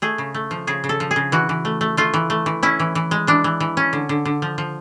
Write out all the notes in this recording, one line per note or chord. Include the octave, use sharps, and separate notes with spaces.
A3 G#4
C#3
A3
F3
C#3 G#4
C#3
A4
F3
G#4
C#3
E3 F#4
E3
A3
A3
A3 F4
E3
A3
E3
C#4 E4
E3
E3
G#3
E3 D4
E3
E3
C#4
D3
D3
D3
F3
F3